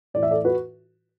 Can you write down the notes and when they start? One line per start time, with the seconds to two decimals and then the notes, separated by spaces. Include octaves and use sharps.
0.14 A2 E3 D5
0.23 E5
0.31 A4 D5
0.45 F#4 B4